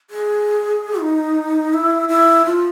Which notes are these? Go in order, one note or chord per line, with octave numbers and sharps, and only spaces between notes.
G#4
D#4
E4
E4
F4